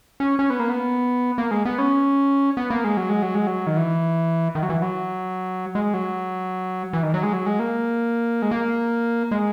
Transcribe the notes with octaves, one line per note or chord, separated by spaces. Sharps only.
C#4
C#4
B3
A#3
B3
A#3
G#3
B3
C#4
B3
A#3
G#3
F#3
G#3
F#3
G#3
F#3
D#3
E3
D#3
F#3
E3
F#3
G#3
F#3
E3
D#3
F#3
G#3
F#3
G#3
A#3
G#3
A#3
G#3